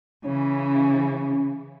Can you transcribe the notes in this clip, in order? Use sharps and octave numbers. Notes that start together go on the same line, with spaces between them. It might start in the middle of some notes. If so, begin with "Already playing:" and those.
C#3 E3 C#4